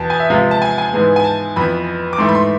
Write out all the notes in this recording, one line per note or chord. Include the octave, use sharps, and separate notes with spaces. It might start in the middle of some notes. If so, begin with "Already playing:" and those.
Already playing: E2 B2 B3 A5
G#5
E5
C3 F3 G#3 B3 F5
A5
G#5
G#5
G#2 E3 G#3 B3
G#5
A5
F2 E3 B3 B5
D6
G#2 E3 A3 C6
B5
C6